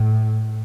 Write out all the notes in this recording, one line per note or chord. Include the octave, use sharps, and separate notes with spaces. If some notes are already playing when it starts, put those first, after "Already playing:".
Already playing: A2